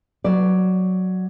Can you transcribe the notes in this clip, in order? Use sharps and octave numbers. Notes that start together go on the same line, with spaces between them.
F#3 D5